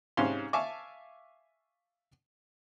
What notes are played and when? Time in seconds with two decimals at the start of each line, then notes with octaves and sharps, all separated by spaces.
0.17 G#2 C3 C#4 F5 C6
0.53 E5 F5 G#5 A5 C#6 D6